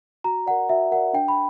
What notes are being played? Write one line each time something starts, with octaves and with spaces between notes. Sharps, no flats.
F#4 A#5
A#4 D5 F#5
F#4 E5
A#4 D5 F#5
D4 G5
B5